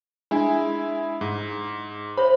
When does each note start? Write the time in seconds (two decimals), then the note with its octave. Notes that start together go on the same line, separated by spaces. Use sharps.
0.31 G#3 D4 E4
1.21 G#2
2.17 C5 C#5 E5 B5